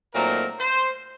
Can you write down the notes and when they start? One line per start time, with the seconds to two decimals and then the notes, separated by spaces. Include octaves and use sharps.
0.13 A#2 F#3 A3 C4 D#4 A#4
0.58 C5